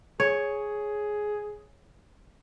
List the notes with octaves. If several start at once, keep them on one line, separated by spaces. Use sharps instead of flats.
G#4 C#5